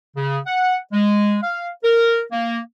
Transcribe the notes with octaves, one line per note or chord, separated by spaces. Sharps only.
C#3
F#5
G#3
F5
A#4
A#3